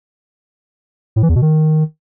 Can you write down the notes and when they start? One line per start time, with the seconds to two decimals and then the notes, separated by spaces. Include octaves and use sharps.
1.16 A2
1.23 E3
1.29 E2
1.35 B2
1.42 D#3